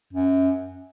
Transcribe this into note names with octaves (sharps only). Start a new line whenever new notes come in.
F#2